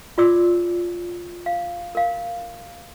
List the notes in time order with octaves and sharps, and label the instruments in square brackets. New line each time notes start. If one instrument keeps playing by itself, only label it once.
[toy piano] F4 G#4 D5 D6 E6
F5
A#4 F5